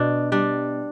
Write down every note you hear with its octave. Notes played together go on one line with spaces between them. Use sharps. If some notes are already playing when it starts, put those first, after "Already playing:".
Already playing: B2 D4
G3 D4